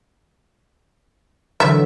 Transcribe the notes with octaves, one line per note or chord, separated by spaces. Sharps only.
D3 E3 F#3 E5